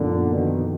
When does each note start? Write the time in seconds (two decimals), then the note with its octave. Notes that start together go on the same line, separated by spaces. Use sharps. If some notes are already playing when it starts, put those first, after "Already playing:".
Already playing: F#2 A#2 D3 F3 B3 D#4
0.32 B2 D#3